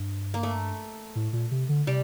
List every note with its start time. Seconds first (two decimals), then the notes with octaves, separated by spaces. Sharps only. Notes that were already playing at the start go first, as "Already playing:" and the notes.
Already playing: G2
0.34 A#3
0.43 A3
1.15 A2
1.33 A#2
1.51 C3
1.69 D3
1.87 C3 G3